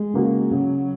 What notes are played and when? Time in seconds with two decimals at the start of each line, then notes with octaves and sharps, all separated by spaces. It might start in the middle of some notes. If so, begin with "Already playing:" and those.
Already playing: G#3
0.14 C#3 A#3 F#4
0.51 C#3 F#3